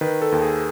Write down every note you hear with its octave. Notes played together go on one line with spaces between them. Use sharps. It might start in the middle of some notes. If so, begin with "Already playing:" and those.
D#3 B4
A4
D#2
G#4